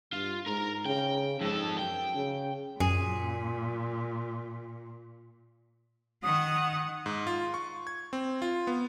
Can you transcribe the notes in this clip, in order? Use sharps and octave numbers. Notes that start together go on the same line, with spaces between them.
G2 F4
G#2 A#4 A#5
C#3 G5
F2 G#2 A4
F#2 G5
C#3
F#2 A#2 G#4
D#3 F#5 D#6
G#2
F4
C#6
G#6
C4
F4
B3